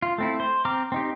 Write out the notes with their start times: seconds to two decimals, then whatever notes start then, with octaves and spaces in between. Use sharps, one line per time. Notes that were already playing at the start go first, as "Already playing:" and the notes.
0.02 F4
0.18 A3 C4 E4
0.40 C5
0.65 C4 A#5 D6 F6
0.92 C4 D#4 G4